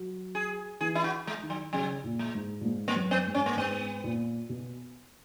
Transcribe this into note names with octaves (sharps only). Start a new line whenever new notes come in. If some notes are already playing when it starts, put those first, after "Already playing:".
Already playing: F#3
G#4
E3 G#4
E4
F#4
G#3
D#3
F#3
C#3 F#3
A#2
G#3
G#2
A#2
G#2
A#3
F#2
B3
G#2
C#4
A#3
G#2 B3
A#2
B2